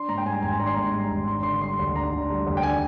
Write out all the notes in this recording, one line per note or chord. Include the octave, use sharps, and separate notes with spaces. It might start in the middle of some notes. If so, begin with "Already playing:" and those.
Already playing: D4 C6
G#2 A#5
G5
G3 G#5
G#1 G#5
D4 A#5
C6
G#2 A#5
G3
G#1
D4 C6
D3 C6
G3 C6
D2
D4 A#5
D3
G3
D2
G5
D4 G#5